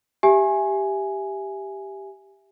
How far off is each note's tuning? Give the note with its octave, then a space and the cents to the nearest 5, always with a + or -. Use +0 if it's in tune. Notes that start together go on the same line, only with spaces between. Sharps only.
G4 +0 E5 +10 G#5 +5